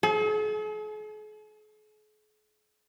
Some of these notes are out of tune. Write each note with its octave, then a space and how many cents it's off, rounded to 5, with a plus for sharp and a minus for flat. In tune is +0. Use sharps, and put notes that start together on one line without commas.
G#4 +45